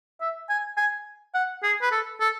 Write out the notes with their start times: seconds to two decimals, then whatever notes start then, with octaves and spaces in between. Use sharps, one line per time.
0.21 E5
0.49 G#5
0.77 G#5
1.34 F#5
1.63 G#4
1.82 B4
1.92 A4
2.20 A4